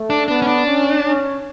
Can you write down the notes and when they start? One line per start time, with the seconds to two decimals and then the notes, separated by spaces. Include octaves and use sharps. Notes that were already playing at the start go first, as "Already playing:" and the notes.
Already playing: A3
0.10 D4
0.28 B3 D4
0.42 C#4
0.47 D4
0.64 C#4
1.02 C#4